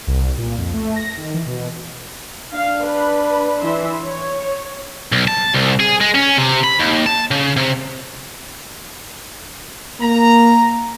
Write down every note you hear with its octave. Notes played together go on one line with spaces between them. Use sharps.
C2
A#2
F2
A3
A#6
D#3
E3
B2
D4 F5
B4 B5
E3 E5 C6
C#5
B1
A5
C2
G#4
G#3
C#4
C3
B5
D#2
A5
C#3
C3
A#3 A#5